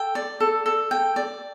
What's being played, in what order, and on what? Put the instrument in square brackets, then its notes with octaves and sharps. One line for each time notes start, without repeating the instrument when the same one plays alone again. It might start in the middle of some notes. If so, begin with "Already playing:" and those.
Already playing: [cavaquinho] A4 G5
D5
A4
A4
G5
D5